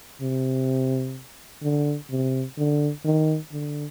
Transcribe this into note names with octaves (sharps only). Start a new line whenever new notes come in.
C3
D3
C3
D3
D#3
D3